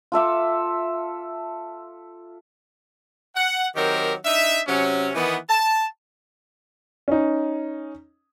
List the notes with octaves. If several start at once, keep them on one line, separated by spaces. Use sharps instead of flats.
F4 A4 E5 D6
F#5
D#3 F#3 C4 G4 A#4
D4 D#4 E5
C3 F#3 C#4
D#3 E3 B3
A5
C#4 D#4